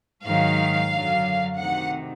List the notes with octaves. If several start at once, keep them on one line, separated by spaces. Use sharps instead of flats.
G#2 D#3 F#3 F5
F#2 D3 F#3
D2 C3 D#3 F#5